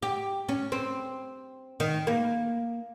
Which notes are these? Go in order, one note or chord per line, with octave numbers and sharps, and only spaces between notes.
G4
C#4
C4
D#3
A#3